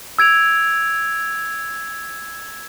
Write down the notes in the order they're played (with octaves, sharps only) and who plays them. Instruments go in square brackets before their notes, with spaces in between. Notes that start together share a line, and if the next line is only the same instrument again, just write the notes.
[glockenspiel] E6 G#6 D7 F7